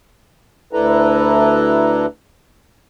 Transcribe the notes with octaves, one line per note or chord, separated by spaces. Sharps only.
D2 D4 E4 A4 B4 A#5